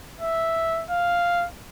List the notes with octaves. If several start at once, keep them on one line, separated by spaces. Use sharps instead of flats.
E5
F5